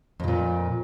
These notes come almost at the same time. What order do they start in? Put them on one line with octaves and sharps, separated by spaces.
F2 C#3 A#2